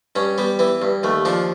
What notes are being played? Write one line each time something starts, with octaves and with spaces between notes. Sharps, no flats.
G2 C#4
G3 B3
E3 B3
G2
D#2 A3
F3 D4